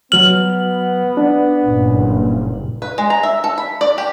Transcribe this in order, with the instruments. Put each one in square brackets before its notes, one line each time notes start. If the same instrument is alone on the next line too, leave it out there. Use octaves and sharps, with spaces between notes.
[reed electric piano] F#3 F6 [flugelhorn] B3 [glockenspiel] F#7
[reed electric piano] D4
[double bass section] F#1 G2 A#2
[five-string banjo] B4
G#3
A#5
E5
A4
B5
D5
G4